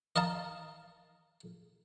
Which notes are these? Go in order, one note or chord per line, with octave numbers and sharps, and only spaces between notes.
D#5 F5 A5 A#5